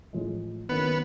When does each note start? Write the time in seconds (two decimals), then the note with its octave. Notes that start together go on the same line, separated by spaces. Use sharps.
0.13 A1 A2 F3 G#3
0.69 F#1 F#2 D#3 B3